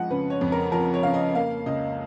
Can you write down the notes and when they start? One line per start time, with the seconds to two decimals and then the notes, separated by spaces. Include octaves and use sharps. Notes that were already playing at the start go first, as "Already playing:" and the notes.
Already playing: F2 F3 G#3 D#5 F#5
0.10 C#3 B4
0.30 C#5
0.41 F2
0.52 A#4
0.72 F3 A#4
0.94 C#5
1.03 C#3 F5
1.14 D#5
1.35 A#3 F5
1.66 C#2 D#5